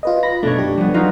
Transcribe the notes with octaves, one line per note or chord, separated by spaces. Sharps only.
F4 B4 D#5
B5 A#6
F#2 B2 A3 D4 C#5
G4
F3 G3 B3
F#3 D#4 F4